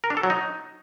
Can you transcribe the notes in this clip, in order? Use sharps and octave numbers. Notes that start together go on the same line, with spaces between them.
A#4
D4
A4
F#3
D#4